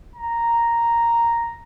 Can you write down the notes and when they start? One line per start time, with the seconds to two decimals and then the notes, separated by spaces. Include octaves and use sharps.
0.16 A#5